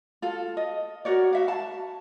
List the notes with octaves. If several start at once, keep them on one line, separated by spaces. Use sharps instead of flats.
F4 A4
D#5
F#4 A#4 C#5 D5
F#4 E5 F5
A5